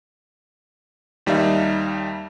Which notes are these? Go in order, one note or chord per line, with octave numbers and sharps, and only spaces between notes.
D#2 G3 D#4 E5 F5